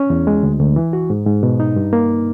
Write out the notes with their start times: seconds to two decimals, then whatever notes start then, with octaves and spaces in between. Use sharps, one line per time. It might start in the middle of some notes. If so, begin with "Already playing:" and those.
Already playing: C#4
0.10 E2
0.27 G#3
0.43 D2
0.60 D2
0.76 E3
0.93 F#4
1.10 G#2
1.26 G#2
1.43 B2
1.60 D#4
1.76 G2
1.93 A#3